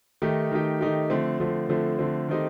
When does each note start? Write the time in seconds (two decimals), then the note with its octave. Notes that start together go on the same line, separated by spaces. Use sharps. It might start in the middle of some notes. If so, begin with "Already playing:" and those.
0.22 D#3 A3 D#4 G4
0.51 D#3 A3 D#4 G4
0.81 D#3 A3 D#4 G4
1.10 D3 F3 A3 C4
1.40 D3 F3 A3 C4
1.69 D3 F3 A3 C4
1.99 D3 F3 A3 C4
2.28 D#3 A3 C4 D#4 G4